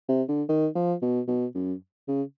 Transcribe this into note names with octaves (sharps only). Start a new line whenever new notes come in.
C3
D3
D#3
F3
B2
B2
F#2
C#3